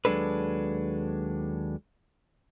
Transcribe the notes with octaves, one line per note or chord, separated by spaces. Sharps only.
D#2 F#3 G#3 D4 A4 B4